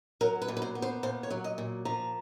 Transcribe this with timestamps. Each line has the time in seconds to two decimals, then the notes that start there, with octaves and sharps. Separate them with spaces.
0.21 F#3 A#4
0.42 B4
0.48 A#2
0.57 B4
0.62 C5
0.75 B3
0.82 C5
1.03 A#2 C5
1.23 C#5
1.30 F#3
1.44 D#5
1.58 A#2
1.85 F3 A#5